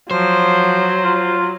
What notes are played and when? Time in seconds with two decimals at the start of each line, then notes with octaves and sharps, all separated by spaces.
0.11 F3 F#3 C5
1.04 F4